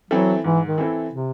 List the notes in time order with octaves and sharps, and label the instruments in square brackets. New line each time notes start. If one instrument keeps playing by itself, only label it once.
[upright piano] E3 C4 E4 A4 [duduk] F#3
[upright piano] G#2 [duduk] E3
[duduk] D#3
[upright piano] E3 C4 E4 A4
[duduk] C3